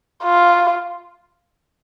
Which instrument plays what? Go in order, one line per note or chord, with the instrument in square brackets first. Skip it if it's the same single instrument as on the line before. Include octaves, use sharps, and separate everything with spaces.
[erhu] F4